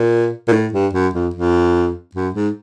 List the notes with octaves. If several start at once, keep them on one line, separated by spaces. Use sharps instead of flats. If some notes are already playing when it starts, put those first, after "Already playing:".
Already playing: A#2
A#2
A2
G2
F#2
F2
F2
F#2
G#2